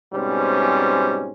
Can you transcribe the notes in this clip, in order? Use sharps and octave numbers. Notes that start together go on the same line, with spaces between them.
G#2 B2 G3 C4 C#4